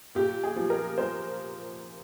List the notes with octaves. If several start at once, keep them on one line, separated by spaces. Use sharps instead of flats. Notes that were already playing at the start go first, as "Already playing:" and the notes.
A#2 G4
G#4
F3
A#4
F3 C5